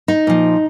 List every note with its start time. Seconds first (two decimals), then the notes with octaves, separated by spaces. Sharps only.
0.08 D#4
0.27 A#2 F3